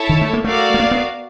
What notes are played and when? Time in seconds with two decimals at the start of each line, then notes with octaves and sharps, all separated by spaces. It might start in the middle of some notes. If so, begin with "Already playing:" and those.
Already playing: E4 A4 C#5 E5 A5
0.09 D#3
0.21 A3
0.33 A#3
0.44 A3 F#4 A#4 D5 F5
0.74 A3
0.80 A#3
0.91 B3